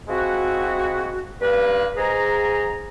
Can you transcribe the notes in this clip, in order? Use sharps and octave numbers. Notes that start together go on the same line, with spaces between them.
F3 G#3 C4 E4 F#4
G2 A#3 B4
G#2 G#4 A#5